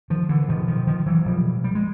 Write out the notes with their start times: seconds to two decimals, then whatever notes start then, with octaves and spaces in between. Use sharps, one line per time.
0.10 D#3 F3
0.29 D3 E3
0.48 B2 D#3 F3
0.68 D#3 F3
0.87 D#3 F3
1.06 E3 F#3
1.26 B2 F3 G3
1.64 G3
1.75 G#3